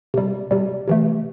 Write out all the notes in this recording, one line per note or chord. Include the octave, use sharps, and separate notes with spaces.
C3 G3
C3 G3
C3 E3 A3